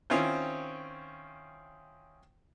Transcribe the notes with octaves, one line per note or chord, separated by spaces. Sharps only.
D#3 C4 C#4 E4 F4 C5